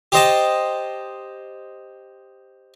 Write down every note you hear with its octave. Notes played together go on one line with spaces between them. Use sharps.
G4 C5 D#5 A5